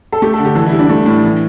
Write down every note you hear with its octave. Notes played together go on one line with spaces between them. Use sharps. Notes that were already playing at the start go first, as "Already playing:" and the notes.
A4
A3 G4
A4
D3
G4
E3 A4
E4
G3
D4
A3 D4
A2
E3